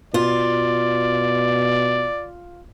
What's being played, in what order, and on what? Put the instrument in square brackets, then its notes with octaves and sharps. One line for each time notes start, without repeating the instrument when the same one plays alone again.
[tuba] B2 [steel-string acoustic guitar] F4 [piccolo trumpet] D5